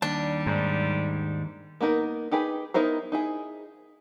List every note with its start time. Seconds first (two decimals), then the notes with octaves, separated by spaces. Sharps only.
0.02 D#2 G3 D4 A5
0.46 G#2
1.81 A#3 B3 D#4 A#4
2.32 D#4 G4 G#4 B4
2.74 B3 D#4 E4 A#4 C5
3.12 D#4 E4 G#4